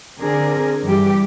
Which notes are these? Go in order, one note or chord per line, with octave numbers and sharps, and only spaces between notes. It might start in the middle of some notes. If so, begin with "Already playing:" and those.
D3 C4 D4 G#4 A#4
G2 E3 G3 G4